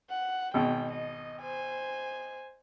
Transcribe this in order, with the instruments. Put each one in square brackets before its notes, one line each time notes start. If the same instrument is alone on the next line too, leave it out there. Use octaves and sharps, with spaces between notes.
[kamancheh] F#5
[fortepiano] G#1 B2 [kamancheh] G5
[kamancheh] D#5
C5 G#5